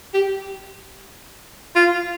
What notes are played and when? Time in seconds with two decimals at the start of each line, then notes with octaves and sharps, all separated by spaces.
0.14 G4
1.76 F4